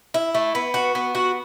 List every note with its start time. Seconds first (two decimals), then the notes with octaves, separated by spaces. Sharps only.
0.14 E4
0.35 A3
0.55 B3
0.74 F#4
0.95 B3
1.15 F#4